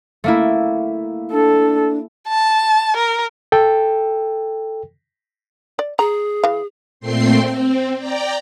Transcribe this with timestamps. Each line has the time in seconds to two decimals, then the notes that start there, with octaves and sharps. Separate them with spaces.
0.24 A3 A#3 E4
1.32 D4 A4
2.28 A5
2.96 A#4
3.52 A4 G5
5.79 D5
5.99 G#4 A#5
6.44 E3 F5
7.00 A#2 A3 C4 G5 C6 C7
7.46 C4
7.97 D5 G5 A#5